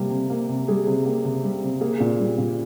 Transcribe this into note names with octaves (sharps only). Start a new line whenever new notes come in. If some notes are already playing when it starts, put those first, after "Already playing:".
Already playing: C3 G3 A#3
C3
A#3
C3
G3 G#4
C3
A#3
C3
G3
C3
A#3 G#4
A#2
G3
A#2